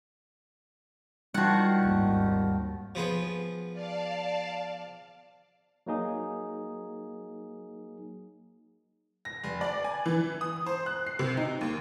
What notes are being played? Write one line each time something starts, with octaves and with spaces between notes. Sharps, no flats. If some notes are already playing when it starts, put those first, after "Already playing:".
D#3 F3 G3 F#4 F#5
G#1 D#2
F3 B3 G#4
D5 F5 A5
F#3 A#3 D#4 G#4
A#6
F1
D5
G#5
E3
D#6
C5
F#6
C7
C3
D#4
D#2